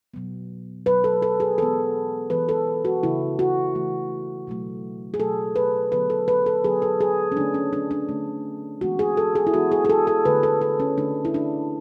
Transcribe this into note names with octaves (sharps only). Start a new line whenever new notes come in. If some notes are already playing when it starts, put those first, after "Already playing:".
B2 F#3 B3
B2 F#3 B3 B4
A4
A4
G#4
E3 G#3 B3 A4
E3 G#3 B3 B4
A4
F#4
C#3 E3 A3 E4
F#4
C#3 E3 A3
B2 F#3 A3
G#4
B2 F#3 A3 A4
B4
D3 F#3 B3 B4
A4
B4
A4
D3 F#3 B3 G#4
A4
G#4
C#4
D3 A3 D4
C#4
D4
D4
D3 A3
E3 G#3 B3 F#4
G#4
A4
G#4
E4
E3 G#3 B3 F#4
G#4
G#4
A4
A4
D3 A3 B4
A4
A4
C#4
D3 A3 D4
E4
D4